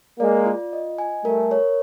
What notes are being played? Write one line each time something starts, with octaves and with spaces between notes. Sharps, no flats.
G#3 A#3 D5
F4
D#5
G#5
G3 A3 A#4
C#5